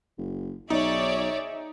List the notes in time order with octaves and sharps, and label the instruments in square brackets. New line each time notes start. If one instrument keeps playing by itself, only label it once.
[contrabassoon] F#1
[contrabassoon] B1 [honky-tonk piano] D#4 [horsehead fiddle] G#4 E5 [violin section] C#5 D5